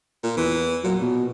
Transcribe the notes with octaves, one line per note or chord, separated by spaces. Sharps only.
A#2
E2 E3
A#2 F#3
B2